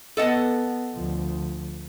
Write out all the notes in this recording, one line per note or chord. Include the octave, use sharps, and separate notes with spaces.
B3 A4 D#5 F#5
D2 F3